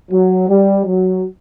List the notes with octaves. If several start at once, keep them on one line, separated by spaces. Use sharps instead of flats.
F#3
G3
F#3